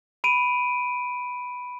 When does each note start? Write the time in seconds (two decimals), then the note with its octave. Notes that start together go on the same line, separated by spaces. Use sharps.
0.24 B5 D7 D#7